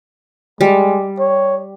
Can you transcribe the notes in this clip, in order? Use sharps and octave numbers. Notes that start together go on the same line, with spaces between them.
G3 G#3
C#5